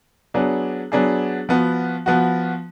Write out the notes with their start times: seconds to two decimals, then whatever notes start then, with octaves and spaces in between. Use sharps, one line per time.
0.34 F#3 B3 D4 G#4
0.92 F#3 B3 D4 G#4
1.49 F3 B3 F#4
2.06 F3 B3 F#4